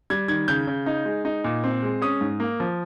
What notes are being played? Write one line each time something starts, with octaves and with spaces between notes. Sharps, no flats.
G3 G#6
D#3 G#6
C#3 G6
C#3
D#4
G#3
D#4
A#2
C4
G#3
C#4 D#6
G#2
A#3
F3